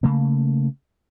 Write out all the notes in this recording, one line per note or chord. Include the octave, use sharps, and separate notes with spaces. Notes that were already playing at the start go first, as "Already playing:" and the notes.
C#3 A3 A#3